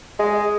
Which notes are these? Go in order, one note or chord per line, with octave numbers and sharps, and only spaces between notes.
G#3